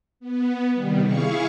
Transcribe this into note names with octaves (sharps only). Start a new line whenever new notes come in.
B3
C3 D#3 G3
E4 G#4 F5 C#6